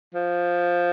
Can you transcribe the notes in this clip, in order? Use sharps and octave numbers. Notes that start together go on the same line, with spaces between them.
F3